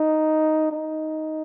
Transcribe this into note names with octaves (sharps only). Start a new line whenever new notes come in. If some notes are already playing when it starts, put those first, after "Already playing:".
Already playing: D#4
D#4